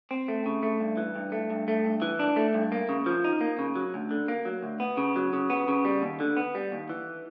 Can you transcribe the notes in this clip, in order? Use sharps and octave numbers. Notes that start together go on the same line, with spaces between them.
C4
A3
C#3
A3
G2
E3
G2
A3
G2
A3
G2
E3
D4
A3
G2
A#3
C#3
F3
D#4
A#3
C#3
F#3
D2
D3
A#3
F#3
D2
B3
C#3
F#3
C#3
B3
C#3
G3
D#2
D3
B3
G3
D#2
E3